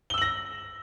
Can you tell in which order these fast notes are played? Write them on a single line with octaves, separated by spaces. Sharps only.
G7 E6 F#7 A#6